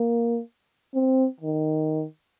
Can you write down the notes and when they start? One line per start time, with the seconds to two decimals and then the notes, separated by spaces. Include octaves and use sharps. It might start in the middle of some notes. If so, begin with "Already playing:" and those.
Already playing: A#3
0.94 C4
1.40 D#3